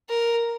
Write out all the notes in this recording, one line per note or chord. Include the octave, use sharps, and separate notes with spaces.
A#4